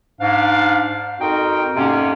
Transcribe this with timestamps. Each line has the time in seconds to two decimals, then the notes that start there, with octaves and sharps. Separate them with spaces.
0.21 G#2 D4 F5
1.20 F2 C4 D#4 F#4 A#4 G5
1.76 F2 G#2 C3 A#3 C#4